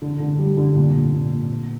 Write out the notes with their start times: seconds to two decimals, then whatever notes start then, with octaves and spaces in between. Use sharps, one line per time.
0.02 D3
0.20 D3
0.39 G3
0.57 D3
0.76 A#2
0.94 A#2
1.13 A#2
1.32 A#2
1.50 B3